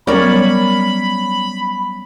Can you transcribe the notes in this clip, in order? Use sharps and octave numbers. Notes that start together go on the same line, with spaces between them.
F#3 G3 B3 C#4 A#4 C#5 D5 B5